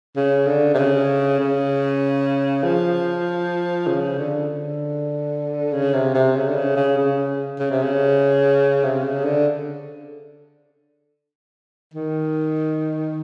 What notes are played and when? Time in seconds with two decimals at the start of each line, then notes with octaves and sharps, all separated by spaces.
0.16 C#3
0.47 D3
0.74 C3
0.78 C#3
1.39 C#3
2.63 F3
3.87 C#3
4.18 D3
4.50 D3
5.73 C#3
5.94 C3
6.15 C3
6.36 C#3
6.49 D3
6.56 C#3
6.76 C#3
6.97 C#3
7.59 C#3
7.71 C3
7.83 C#3
8.84 C3
9.03 C#3
9.25 D3
11.94 D#3